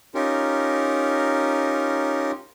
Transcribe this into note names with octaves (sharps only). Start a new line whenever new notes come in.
C#4 D#4 F4 G4 A#4